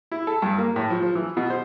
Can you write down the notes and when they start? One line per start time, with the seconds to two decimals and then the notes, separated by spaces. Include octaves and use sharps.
0.12 E4
0.27 A4
0.42 G2
0.58 A#3
0.76 A2
0.90 F3
1.03 F3
1.16 E3
1.37 B2
1.50 C5